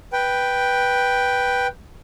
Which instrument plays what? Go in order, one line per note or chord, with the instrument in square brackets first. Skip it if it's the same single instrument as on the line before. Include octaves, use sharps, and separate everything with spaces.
[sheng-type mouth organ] B4 G5